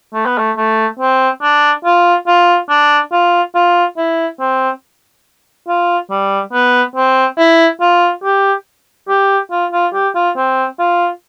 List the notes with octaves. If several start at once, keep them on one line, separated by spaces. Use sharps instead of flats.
A3
B3
A3
A3
C4
D4
F4
F4
D4
F4
F4
E4
C4
F4
G3
B3
C4
E4
F4
G4
G4
F4
F4
G4
F4
C4
F4